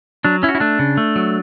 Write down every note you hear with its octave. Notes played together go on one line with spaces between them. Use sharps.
F#3 D4
C#4 E4
F#4
E4
A3 D4
C#3
A3
F#3